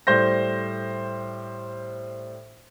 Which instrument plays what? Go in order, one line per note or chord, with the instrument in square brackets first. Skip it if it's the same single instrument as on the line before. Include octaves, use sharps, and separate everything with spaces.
[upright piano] A2 G3 C5 G6 A#6